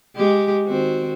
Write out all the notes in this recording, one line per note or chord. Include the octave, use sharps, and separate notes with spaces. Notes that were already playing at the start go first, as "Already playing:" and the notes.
G#3 G4
D#3 C4 F#4